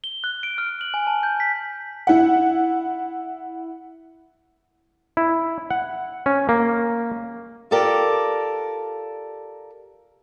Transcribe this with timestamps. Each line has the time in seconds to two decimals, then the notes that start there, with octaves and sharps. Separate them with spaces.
0.04 G7
0.24 F#6
0.43 D7
0.58 F6
0.81 F#7
0.94 G#5
1.07 A5
1.23 G6
1.40 B6
2.07 E4 F#5
5.17 E4
5.71 F#5
6.26 C#4
6.49 A#3
7.71 F4 G4 A4 A#4 D5